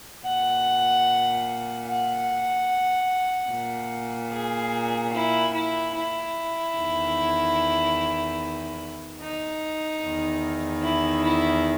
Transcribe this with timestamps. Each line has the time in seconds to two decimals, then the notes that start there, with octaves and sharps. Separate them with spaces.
0.25 A#2 F#5
1.88 F#5
3.50 A#2
4.32 G#4
5.13 E4
5.53 E4
5.94 E4
6.75 E2 D#3
9.20 D#4
10.02 E2 D#3
10.83 E4
11.24 E4